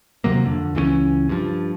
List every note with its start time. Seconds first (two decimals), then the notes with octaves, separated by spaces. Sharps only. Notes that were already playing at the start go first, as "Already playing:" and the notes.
0.24 D#2 C3 F#3 A#3
0.44 F2 D3
0.75 C#2 E3 A3 C#4
1.29 G2 F3